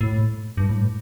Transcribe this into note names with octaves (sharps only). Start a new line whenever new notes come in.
A2
G2
A2